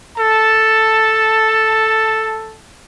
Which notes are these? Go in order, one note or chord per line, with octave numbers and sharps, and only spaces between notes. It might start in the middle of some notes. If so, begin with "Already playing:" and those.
A4 A5